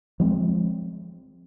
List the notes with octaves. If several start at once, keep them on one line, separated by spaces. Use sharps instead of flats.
F3 G#3 C4